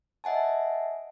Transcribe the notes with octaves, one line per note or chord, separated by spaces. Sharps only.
D#5 E5 F#5 G#5 A5